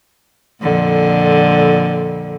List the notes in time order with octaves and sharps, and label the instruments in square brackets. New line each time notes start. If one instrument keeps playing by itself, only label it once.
[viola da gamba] F2 A#2 D3